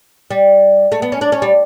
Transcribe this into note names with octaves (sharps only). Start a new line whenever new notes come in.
G3
A3
B3
C#4
D4
C#4
G3